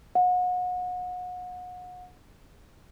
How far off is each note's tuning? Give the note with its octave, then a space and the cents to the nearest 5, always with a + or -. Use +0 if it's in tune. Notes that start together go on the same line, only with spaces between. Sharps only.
F#5 -35